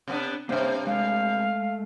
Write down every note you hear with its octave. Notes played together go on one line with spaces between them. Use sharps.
C3 B3 D4
G2 C3 A#3 C5 E5
G#3 A3 F5